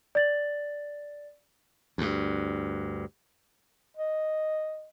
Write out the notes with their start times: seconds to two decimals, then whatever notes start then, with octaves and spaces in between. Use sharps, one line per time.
0.15 D5 A6 F#7
1.98 D2 G2
3.97 D#5